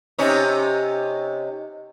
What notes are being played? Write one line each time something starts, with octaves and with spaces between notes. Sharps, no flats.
C3 C#4 D#4